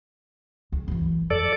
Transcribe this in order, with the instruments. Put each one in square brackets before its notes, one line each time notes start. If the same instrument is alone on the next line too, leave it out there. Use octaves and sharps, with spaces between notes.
[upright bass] C#2
F#2 E3
[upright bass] F2 [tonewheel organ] A4 D5